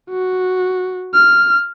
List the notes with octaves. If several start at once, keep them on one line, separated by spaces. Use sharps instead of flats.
F#4
F6